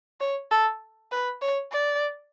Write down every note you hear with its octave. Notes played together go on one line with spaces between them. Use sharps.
C#5
A4
B4
C#5
D5